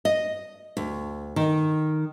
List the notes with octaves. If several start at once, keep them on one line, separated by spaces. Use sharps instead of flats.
D#5
D2
D#3